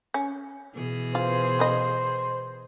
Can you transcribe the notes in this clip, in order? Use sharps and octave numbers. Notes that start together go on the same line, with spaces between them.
C#4
B2 E3 G#4
F4 C5
F3 B4 D#5